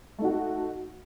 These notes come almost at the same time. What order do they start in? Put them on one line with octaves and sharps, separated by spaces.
A3 D#4 F#4